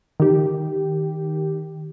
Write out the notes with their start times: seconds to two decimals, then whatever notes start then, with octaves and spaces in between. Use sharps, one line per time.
0.20 D#3 G4